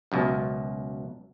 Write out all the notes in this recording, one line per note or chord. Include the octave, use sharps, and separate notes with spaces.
C#2 F#2 B2